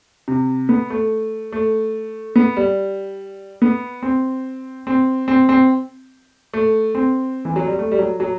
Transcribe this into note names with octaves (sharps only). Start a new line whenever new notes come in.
C3
B3
A3
A3
B3
G3
B3
C4
C4
C4
C4
A3
C4
E3
F#3
G3
A3
G3
F#3
F#3